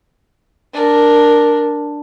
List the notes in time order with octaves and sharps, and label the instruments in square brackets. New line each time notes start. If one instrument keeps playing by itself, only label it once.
[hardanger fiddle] D4 A#4